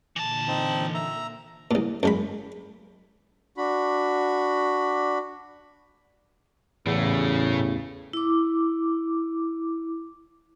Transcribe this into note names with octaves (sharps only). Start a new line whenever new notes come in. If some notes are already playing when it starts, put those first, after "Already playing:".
A#2 D3 E3 A5
C4 D#4
E5 A#5
C2 A#2
F#2 G#3 B5
D4 F#4 B5
A1 E2 A2 C#3 A3
E4 D6